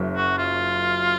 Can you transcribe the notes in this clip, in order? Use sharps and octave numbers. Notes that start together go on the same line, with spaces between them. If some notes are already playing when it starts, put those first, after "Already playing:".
Already playing: F#1 F#2 F#3
F#4
F4